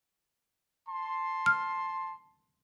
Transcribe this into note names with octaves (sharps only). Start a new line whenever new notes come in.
A5 C6
F6